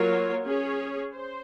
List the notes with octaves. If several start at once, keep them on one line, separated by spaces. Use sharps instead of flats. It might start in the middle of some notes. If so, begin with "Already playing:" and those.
Already playing: F#3 A#3 F4 A#4 C#5
C#4 G#4 C#5
C5